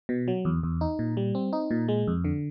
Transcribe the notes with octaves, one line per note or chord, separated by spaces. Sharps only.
B2
F#3
E2
E2
D#4
A#2
G3
C4
D#4
A#2
G#3
F2
D3